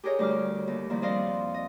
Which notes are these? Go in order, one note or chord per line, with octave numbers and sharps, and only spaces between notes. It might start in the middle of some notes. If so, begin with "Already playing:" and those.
G4 G#4 A#4 C#5 D#5
D2 G3 D6 F6
D#2
D#3 F3 G3 A#3 E4
F2 F3 D5 D#5 F5 C6
D#5